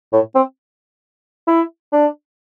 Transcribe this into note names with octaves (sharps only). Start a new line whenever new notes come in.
A2
C4
E4
D4